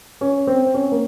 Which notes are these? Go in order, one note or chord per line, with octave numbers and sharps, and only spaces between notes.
C#4
C4
C#4
A#3